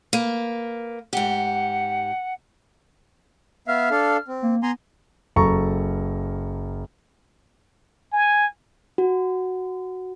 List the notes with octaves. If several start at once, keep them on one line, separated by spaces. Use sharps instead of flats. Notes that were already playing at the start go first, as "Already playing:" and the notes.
A#3 B4
G#2 G4 F#5
B3 E5 F5 F6
D4 A4 F5
C4
A#3
B3 G#5 A#5 C6
F#1 A4 A#5 C#6
G#5
F#4